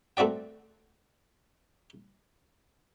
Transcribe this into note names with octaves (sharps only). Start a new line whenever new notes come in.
A3 C4 F#4 D5 G5